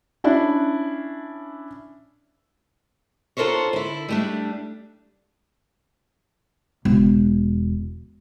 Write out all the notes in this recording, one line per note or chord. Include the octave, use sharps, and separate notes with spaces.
C#4 D4 E4
D4 F4 A4 A#4 C5 C#5
D3 E4
G3 A3 D4
E1